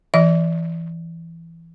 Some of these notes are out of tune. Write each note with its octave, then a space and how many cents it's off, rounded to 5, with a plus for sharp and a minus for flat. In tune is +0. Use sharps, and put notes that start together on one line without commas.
E3 +15 E5 -45